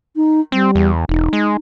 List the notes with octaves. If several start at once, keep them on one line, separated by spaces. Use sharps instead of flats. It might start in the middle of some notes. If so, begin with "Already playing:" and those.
D#4
G3 C4
E2
E1 D#4
G#3